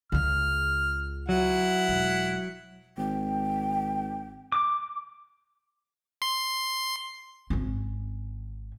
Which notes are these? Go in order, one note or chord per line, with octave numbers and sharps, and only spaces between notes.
C#2 C#3 F6
F#3 E4 F#5
E1
G#1 G5
D6
C6
G#1 C#4